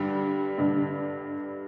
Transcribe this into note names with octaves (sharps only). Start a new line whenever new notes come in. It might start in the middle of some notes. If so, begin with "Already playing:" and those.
Already playing: G2 D3 G3
G2 D3